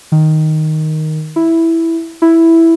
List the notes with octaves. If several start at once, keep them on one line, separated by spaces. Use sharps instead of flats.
D#3
E4
E4